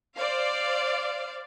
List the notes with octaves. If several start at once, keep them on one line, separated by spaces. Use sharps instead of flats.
C5 D5 F5